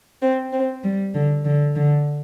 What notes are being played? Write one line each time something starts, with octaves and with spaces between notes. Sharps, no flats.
C4
C4
G3
D3
D3
D3